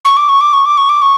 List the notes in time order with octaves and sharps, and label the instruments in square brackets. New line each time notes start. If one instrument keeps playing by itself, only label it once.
[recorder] C#6
D6
C#6
D6
C#6
D6
C#6
D6
C#6